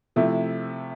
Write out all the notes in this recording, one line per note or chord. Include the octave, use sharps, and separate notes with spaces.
C3 F3 A3 E4